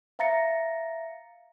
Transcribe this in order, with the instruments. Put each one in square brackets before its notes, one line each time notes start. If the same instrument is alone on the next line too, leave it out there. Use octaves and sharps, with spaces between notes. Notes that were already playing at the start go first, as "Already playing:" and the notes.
[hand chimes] E5 F5 A#5 A6 A#6 C#7